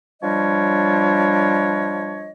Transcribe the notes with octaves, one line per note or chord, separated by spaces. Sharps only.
F3 G3 D4 C#5 D#5